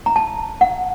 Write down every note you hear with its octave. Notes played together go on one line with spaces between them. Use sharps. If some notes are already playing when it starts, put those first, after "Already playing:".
A#5
A5
F#5